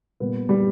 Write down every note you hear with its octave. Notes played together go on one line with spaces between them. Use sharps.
A#2 G3 B3
G3 G4